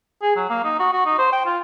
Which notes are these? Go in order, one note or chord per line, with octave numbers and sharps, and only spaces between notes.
G#4
F#3
A#3
D#4
F#4
F#4
D#4
C5
G5
F4